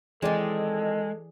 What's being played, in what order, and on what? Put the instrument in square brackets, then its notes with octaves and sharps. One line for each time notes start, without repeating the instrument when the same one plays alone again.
[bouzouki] D#3 C4 [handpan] E3 G#4 D5 [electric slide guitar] G#3 [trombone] A4